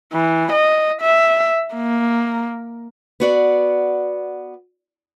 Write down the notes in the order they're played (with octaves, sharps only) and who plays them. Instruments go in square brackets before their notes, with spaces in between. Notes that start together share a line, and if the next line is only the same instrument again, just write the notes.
[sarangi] E3
D#5
E5
A#3
[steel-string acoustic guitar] B3 F#4 D5